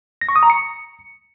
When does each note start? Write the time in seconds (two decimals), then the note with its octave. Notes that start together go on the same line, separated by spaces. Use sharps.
0.21 A#6
0.29 C#6
0.36 D#6
0.43 A#5
0.50 C#7